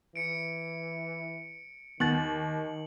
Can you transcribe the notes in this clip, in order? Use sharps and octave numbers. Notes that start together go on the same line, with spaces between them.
E3 C#7 D7
D#2 D#3 B3 F#6 A6 F#7